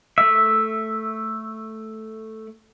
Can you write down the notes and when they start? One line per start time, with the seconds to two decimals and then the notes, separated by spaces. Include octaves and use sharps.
0.18 A3 E5